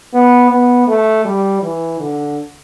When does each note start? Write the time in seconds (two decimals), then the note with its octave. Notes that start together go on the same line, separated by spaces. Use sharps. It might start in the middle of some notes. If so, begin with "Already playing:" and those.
0.14 B3
0.51 B3
0.87 A3
1.25 G3
1.62 E3
2.00 D3